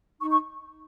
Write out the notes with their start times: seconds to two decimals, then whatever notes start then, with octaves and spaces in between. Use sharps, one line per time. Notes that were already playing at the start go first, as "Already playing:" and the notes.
0.21 D#4 C#6
0.31 C#6